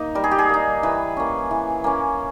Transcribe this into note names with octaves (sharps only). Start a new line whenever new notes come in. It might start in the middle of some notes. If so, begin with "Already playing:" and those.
Already playing: A#3 D#4
G3 A#4
G#4
G4
G#4
A#3 D#4
E3 B4
A#3 C#4
E3
A#3 C#4